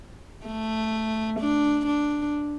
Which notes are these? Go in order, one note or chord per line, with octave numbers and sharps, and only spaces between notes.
A3
D4
D4